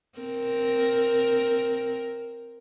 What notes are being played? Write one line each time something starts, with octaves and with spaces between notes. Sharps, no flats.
C4 A#4